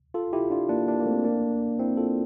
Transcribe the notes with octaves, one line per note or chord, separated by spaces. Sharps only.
F4 A4
E4 G4
D4 F4
A#3 D4
A#3 D4
A#3
A3 C4
A#3 D4
C4 E4
F4 A4